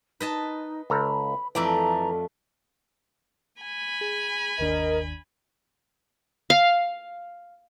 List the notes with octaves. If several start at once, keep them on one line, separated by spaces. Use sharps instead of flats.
D#4 B4 D#5 A5
C#2 A4 A#5 B5
F2 E3 A3 D5 A#5
G#5 B5
G#4
G1 D#2 D4 A#4 D#5
F5